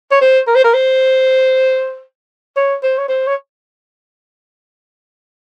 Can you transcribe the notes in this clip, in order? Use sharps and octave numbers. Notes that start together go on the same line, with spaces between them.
C#5
C5
A#4
C5
A#4
C5
C#5
C5
C#5
C5
C#5